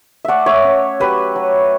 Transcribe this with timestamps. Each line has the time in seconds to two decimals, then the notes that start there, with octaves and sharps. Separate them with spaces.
0.25 A3 D5 E5 F#5
0.46 C#5 E5
0.64 C#4
1.00 F#3 G4 B4
1.36 F#3